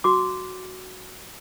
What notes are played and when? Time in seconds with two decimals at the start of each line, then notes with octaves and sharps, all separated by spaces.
0.04 F#4 D6